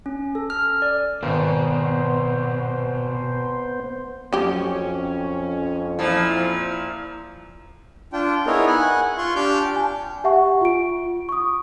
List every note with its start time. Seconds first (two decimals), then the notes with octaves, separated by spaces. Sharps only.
0.06 C#4
0.35 A4
0.50 F6
0.82 D5
1.23 G#1 B2 B3 C5
4.33 F2 F#3 C#4 G4
5.99 A#2 F3 E4
8.13 D4 F4 G5
8.46 B3 D#4 E4 G#4 A#4 C#5
8.67 F#5 G#5
9.18 F4 C6 C#6
9.36 D4 G4 G5 F6 G6
9.76 G#5 A5
10.24 G4 E5 F#5 C#6
10.61 F4 D7
11.29 C#6 D#6